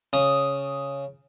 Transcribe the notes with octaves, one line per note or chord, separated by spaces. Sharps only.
C#3 D#6